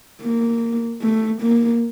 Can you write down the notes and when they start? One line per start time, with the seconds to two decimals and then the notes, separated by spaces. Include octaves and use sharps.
0.22 A#3
1.02 A3
1.42 A#3